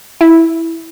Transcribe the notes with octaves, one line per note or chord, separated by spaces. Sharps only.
E4